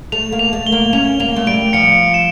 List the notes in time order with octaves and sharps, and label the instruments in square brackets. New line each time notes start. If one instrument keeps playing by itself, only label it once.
[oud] A3 [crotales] F7
[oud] A#3
[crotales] F7
[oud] A3
[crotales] G7
[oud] A#3
[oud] C#4 [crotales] F7
[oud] A#3 [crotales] F7
[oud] A3
[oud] G3 [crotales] D7
[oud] F3 [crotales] C#7
[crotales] E7